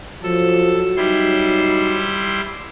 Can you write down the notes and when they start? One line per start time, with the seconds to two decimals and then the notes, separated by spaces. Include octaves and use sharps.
0.23 F3 F#3 A4
0.97 G3 D#4 E4 C6